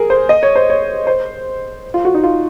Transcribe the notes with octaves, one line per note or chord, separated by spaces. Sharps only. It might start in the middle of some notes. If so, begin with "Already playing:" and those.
Already playing: G#4 A#4
C5
D#5
C#5
C5
C#5
C5
F4
F#4
D#4
F4